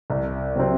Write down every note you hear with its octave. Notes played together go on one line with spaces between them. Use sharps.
C2
C3 F#3 C4